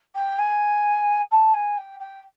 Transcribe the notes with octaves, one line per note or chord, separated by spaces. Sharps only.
G5
G#5
A5
G#5
G5
G5